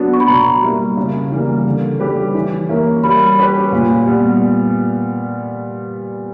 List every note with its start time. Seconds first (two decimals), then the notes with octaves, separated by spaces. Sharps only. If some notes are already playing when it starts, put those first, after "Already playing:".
Already playing: F#3 B3 D4 F#4
0.13 C#6
0.20 B5
0.28 B2 A#5
0.62 G3 A#3 E4
0.97 C#3
1.32 E3 G3 A#3
1.65 D3
2.00 G3 C#4 G4 B4
2.34 E3
2.69 A#3 C#4 E4 A#4
3.03 G3 B5
3.38 C#4 G4 B4
3.72 A#2
4.07 G3 B3